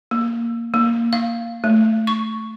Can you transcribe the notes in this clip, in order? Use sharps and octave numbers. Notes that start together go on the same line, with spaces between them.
A#3
A#3
F5
A3
C#6